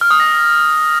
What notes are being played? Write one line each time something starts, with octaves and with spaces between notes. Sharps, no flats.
F6
D#6
A#6